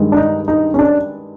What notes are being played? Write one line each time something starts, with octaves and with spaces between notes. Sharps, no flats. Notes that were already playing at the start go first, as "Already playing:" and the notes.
Already playing: G2 D#3 G#3
D4
D#4
D#4
C#4
D4